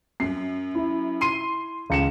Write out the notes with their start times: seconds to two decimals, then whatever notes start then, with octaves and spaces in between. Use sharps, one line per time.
0.20 F#2 C7
0.75 E4
1.21 C6 C7 D#7
1.90 C#2 C#7 E7